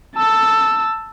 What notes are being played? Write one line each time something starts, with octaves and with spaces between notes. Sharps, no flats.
A5 E6